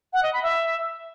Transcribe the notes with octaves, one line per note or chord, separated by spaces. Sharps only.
F#5
D#5
B5
E5